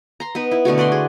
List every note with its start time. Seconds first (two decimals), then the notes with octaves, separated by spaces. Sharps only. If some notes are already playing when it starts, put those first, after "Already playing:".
0.20 A#5 C6
0.35 B3 D#4 B4
0.51 E4
0.65 B2 D3 A3 F#4
0.78 B4 D5 F#5 C6
0.92 G#4